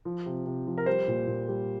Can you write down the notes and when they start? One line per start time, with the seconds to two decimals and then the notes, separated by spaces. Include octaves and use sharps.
0.05 F3
0.26 C3
0.46 C3
0.67 F3
0.78 A#4
0.86 G3 C5
1.08 A#2
1.27 A#2
1.48 G3